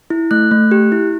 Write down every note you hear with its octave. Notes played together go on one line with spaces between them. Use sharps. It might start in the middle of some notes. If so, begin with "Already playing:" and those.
E4
A3 F#6
A3
G4
E4